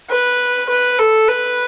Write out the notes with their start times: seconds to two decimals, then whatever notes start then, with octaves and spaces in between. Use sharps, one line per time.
0.10 B4
0.69 B4
0.98 A4
1.28 B4